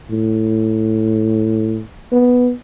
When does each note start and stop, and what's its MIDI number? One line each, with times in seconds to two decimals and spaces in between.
0.10 1.82 45
2.12 2.52 59